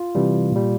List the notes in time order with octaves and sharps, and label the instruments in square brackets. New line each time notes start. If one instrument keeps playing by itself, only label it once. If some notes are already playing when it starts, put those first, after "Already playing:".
Already playing: [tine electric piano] F4
C3 E3 G3
A#2 G3